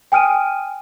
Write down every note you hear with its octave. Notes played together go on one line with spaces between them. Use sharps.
G5 G#5 D#6 F6 D7 D#7